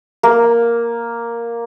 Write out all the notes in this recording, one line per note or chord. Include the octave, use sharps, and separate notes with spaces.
A#3